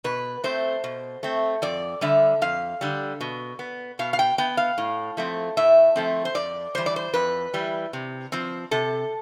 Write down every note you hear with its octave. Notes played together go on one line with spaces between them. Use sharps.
B2 B4
A3 C4 C5
B2
A3 C4
F2 D5
D3 G3 E5
F2 F5
D3 G3
B2
B3
B2 F5
F5
G5
B3 G5
F5
A2
F3 A3 C4
A2 E5
F3 A3 C4
C5
F2 D5
E3 G3 C5
D5
C5
F2 B4
E3 G3
C3
F3 C4
C3 A4